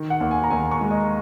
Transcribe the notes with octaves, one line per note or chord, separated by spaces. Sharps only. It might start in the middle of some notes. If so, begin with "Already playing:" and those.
Already playing: D#3
F#5
D#2
G#5
A#5
D#2 G#5
C#6
G#3
D#5